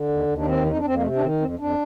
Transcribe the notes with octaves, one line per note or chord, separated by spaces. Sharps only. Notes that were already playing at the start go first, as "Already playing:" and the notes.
Already playing: D3
D#2
D#2
D4
D#3 C4
F2 D#4
D4
F2 C4
A#3
C3 A3
D4
D#3 C4
F2 C4
F2 D4